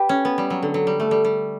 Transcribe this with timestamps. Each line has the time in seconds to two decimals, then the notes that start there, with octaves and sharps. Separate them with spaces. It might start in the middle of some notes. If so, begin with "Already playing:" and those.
Already playing: G4 B4
0.09 C#4
0.25 B3
0.38 G3
0.50 F#3
0.62 D3
0.74 F#3
0.87 G3
1.00 A3
1.11 G3
1.25 G3